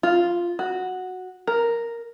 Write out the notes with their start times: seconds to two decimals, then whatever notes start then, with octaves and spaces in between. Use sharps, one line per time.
0.03 F4
0.59 F#4
1.47 A#4